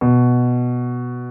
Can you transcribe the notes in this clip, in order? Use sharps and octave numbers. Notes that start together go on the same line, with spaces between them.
B2